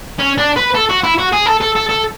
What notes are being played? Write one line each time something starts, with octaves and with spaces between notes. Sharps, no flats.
C#4
D4
B4
A4
F#4
E4
F#4
G#4
A4
A4
A4
A4